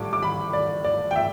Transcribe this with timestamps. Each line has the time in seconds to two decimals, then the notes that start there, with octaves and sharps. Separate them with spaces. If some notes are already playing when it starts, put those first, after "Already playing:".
Already playing: A2 G3 D6
0.13 D6
0.22 B5
0.53 D5
0.84 D5
1.11 G5
1.16 E5